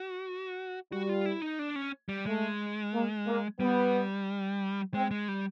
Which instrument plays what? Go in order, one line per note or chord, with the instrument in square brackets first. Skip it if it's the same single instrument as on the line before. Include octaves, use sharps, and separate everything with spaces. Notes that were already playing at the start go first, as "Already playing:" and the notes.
Already playing: [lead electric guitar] F#4
[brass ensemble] G3 [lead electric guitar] F#4
[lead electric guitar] F4
E4
D#4
D4
C#4
G3
[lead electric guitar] G#3 [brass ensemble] A3
[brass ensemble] A#3
A#3
[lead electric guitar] G3 [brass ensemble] B3
[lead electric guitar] G#3 [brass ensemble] C4
[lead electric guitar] G#3
G3